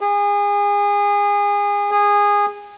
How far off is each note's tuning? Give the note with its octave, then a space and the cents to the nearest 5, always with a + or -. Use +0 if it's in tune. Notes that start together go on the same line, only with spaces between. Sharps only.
G#4 -30
G#4 -20